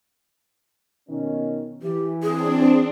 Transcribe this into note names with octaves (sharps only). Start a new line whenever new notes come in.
B2 D#3 C#4
E3 G4
C4 D4 G#4